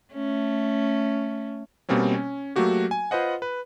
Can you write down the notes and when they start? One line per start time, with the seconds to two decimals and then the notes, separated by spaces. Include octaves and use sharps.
0.14 A3 C#4
1.89 B2 G3 A#3 C4 C#4
2.14 C#4
2.56 F#3 A3 A#3 F#4 G4
2.91 G#5
3.11 F4 B4 C5 D#5 F#5
3.42 B4